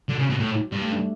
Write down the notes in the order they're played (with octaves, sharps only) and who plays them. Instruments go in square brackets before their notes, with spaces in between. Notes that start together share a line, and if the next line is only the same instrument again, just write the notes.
[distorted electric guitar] D3 [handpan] F#3
[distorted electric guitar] C#3
B2
A2
[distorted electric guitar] G2 [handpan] G3
[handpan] A3
D4